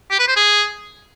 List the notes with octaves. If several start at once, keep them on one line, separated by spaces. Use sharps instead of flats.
G4
B4
C5
G#4